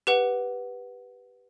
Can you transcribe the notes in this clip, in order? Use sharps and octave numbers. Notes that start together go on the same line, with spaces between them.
G4 B4 F#5